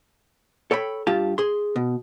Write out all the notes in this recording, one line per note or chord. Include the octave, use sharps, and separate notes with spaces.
A4 C#5 G5 B5
G2 F4 G4 A5
G#4 C6
B2